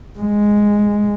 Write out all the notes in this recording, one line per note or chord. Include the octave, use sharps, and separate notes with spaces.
G#3